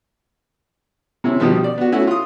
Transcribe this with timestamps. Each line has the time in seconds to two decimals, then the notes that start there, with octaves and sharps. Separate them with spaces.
1.24 C3 C#4 E4
1.40 B2 D#3 F3 G3 B3
1.64 D5
1.78 B3 F#4
1.92 A3 C#4 E4 F#4
2.07 F4 D#6